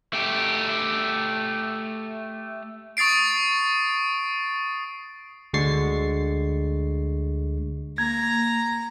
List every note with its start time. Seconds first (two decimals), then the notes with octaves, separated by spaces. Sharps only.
0.13 A3 G4
2.97 C#6 D#6 A6 C7 D7
5.54 D2 D3 G#3 C#6 A6 C7
7.98 A#3 A#5 G#6